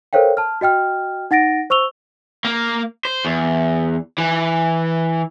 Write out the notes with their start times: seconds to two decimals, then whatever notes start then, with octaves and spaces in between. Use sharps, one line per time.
0.13 A4 A#4 C5 C#5 F5 G5
0.37 A5 F6
0.61 F#4 D#5 G5 F6
1.31 D#4 F#5 A6 A#6 D7
1.70 C5 C#6 E6 F7 G7
2.45 A#3
3.05 C5
3.25 E2
4.18 E3